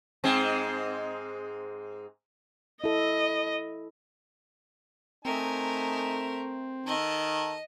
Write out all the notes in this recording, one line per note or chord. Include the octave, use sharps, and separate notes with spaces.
G#2 G#3 C4
E4 A4 D#5
A3 C4 D#4 A#4 G#5
D#3 A4 D#5